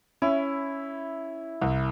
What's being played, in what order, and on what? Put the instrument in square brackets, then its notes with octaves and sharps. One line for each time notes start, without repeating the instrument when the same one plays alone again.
[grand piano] C#4 [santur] E4
[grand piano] C2